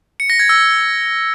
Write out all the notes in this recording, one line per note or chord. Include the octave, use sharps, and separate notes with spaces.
C#7
A#6
G#6
E6